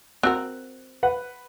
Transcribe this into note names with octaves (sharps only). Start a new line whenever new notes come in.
C4 F#4 A#4 F#6
B4 F#5